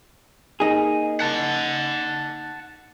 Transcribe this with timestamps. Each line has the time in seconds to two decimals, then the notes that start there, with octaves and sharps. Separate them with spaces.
0.60 A#3 D#4 G#4
1.20 F#5 A5